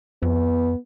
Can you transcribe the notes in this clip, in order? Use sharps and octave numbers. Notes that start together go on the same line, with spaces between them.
F2 B3